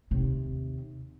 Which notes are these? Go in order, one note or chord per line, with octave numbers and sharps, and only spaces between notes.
D#2 C3